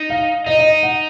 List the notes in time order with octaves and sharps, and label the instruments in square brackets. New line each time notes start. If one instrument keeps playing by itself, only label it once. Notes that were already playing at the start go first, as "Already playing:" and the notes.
Already playing: [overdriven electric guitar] D#4
[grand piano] F5
[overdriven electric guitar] D#4 [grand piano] D#5
[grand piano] D#5
F#5